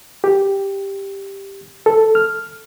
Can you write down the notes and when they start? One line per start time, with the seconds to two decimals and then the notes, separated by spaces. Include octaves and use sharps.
0.24 G4
1.86 A4
2.15 F6